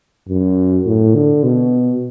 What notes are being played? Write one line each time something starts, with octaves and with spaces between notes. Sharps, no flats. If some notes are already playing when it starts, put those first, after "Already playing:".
F#2
A2
D3
B2